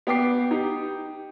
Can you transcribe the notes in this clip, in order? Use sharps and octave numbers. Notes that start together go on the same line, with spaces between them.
B3 G5 D6 C7
D#4 G4